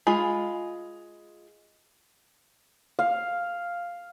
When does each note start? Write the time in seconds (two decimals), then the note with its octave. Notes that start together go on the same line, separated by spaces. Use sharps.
0.07 G#3 F4 G#4 G#5 B5
2.99 F5